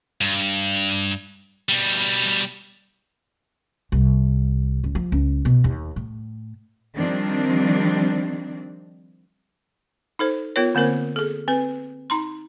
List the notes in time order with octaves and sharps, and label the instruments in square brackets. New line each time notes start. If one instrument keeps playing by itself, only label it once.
[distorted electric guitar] G2
B2 G3
[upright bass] C2
C#2
F3
C#2
B2
D#2
A2
[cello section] D#3 F3 G3 C4 D4
[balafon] D#4 A4 C5
B3 F4 A#4 C#5
D3 A#3 C4 A#4 C5
G#4 A4
C4 B4
D#4 A#5 C6